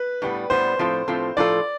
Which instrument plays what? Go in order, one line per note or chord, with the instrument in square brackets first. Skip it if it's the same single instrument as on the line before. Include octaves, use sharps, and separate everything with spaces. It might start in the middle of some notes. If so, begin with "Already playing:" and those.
Already playing: [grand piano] B4
[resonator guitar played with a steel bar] A2 G3 B3
[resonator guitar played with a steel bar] A2 G3 B3 [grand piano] C5
[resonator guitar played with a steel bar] A2 F3 C4 F4 A4
A2 F3 C4 F4 A4
[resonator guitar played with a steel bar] A2 F3 C4 F4 A4 [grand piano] D5